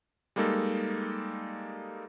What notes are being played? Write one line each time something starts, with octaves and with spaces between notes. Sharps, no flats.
G3 G#3 A#3 D#4 A4